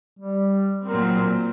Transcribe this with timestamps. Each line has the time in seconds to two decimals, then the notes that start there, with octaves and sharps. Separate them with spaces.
0.19 G3
0.86 A#2 F#3 C4 A#4